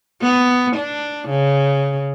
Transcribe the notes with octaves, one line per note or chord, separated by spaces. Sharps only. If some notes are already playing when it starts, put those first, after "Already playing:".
B3
D4
C#3